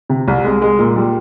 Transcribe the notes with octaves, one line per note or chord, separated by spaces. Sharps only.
C3
C2
G#3
G#3
A#2
G3